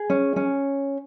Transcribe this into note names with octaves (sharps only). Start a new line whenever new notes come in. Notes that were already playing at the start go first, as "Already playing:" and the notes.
Already playing: G#4
C#4
C#4